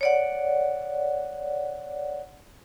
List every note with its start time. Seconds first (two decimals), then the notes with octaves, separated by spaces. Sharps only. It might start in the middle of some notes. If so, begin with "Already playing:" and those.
0.01 C#5 D5 F#5